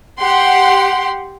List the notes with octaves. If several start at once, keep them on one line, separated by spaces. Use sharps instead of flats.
G4 F#5 C6